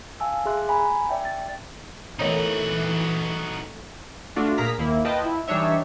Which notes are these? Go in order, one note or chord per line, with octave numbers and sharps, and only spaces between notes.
F5 G#5 A5 E6
G#4 E5 C6 F#6
G#5 A#5 B5
D5 E5 G5 A5
A6
E3 A3 C4 D#4 F#4 A#4 C#5 D#5
A3 D4 F4 F#4
A#2 G#4 A#4 A#5 B6
D#2 A#3 E4
F4 B4 D#5 G5 A5
E4
E3 G3 D4 D#4 C#5 E5